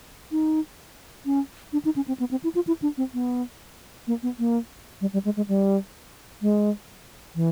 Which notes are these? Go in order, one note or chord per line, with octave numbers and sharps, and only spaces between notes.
D#4
C#4
D4
D#4
C#4
C4
B3
C4
E4
F4
E4
D4
C4
B3
A#3
B3
A#3
G3
G3
G#3
G#3
G3
G#3
E3